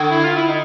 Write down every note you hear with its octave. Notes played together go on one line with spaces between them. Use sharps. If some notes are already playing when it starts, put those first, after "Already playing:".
Already playing: D3
E4
F4
E4
D#4